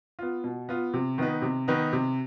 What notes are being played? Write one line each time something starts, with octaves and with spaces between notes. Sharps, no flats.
B3 F4
B2
B3 F4
C3
D#3 B3 D#4 B4
C3
D#3 B3 D#4 B4
C3